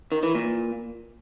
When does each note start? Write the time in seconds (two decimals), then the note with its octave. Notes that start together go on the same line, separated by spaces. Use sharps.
0.12 D#3
0.23 E3
0.35 A#2